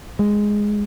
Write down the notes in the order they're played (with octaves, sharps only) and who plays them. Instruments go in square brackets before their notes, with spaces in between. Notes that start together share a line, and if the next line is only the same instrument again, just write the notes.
[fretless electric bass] G#3